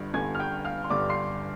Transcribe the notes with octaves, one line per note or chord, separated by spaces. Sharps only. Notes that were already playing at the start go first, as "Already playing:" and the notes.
Already playing: G1 G2 D3
G1 G2 D3 G#5 G#6
F6
G5 G6
F5 F6
C6
G1 G2 D3 D5 D6
C6 C7